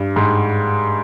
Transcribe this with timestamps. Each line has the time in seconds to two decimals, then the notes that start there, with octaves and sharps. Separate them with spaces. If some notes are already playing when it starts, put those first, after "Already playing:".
Already playing: G2
0.16 G#2